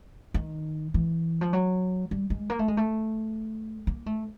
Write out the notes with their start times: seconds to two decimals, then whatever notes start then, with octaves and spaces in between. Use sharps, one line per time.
0.34 D#3
0.94 E3
1.41 F3
1.53 F#3
2.11 G3
2.30 G#3
2.50 A#3
2.59 A3
2.68 G#3
2.77 A3
3.87 A#3
4.06 A3